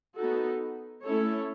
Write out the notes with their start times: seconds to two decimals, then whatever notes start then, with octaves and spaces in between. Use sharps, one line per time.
0.17 B3 D#4 F#4 A4
1.05 A3 C#4 E4 A4 C#5